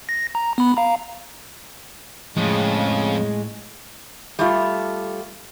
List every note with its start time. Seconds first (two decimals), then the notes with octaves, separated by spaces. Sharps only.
0.09 A#6
0.35 A#5
0.58 B3 B5
0.77 F5 A#5
2.37 F2 A2 C#3 G#3
4.39 G3 A3 F4